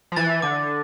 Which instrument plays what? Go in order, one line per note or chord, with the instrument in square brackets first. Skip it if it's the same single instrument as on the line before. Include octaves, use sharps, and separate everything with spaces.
[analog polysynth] F3
[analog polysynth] E3 [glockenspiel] A6
[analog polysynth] D3 [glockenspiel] D6